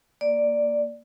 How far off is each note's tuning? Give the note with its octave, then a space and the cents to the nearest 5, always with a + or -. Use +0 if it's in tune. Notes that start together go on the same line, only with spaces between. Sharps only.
A#3 +0 D5 +0